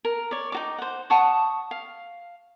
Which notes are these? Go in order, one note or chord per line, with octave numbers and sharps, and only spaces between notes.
A#4
C#5 D5
D#4 F#4 D6
C5 F#5
F#5 A5 C#6 D#6
F5